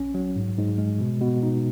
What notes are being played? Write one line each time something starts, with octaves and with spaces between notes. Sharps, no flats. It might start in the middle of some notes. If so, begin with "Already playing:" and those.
Already playing: A#1 C#4
F#3
G#2
G#2
G#3
B2
B2
D#4